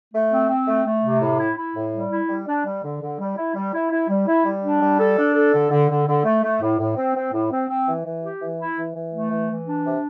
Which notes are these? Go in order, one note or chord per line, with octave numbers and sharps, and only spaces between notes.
A3
C4
C4
A3
A3
C3
A2
E4
E4
A2
G3
E4
G3
D4
G3
D3
D3
G3
E4
G3
E4
E4
G3
E4
G3
D4
G3
A4
D4
A4
D3
D3
D3
D3
A3
A3
A2
A2
C4
C4
A2
C4
C4
E3
E3
G4
E3
E4
E3
E3
A3
E3
E3
D4
C3